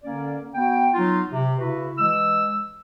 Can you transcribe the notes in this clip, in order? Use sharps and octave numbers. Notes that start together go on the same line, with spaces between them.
D3 A#3 C#4 D5
B3 F#4 G5
F#3 B3 D#4 F4
C3
C#3 E4 F#4 B4
E3 G#3 E6